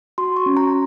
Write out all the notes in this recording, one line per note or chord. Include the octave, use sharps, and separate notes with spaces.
F#4 C6
C#6
C#4
A#5